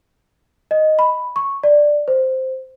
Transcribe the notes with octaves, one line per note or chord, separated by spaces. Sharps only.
D#5
B5
C#6
D5
C5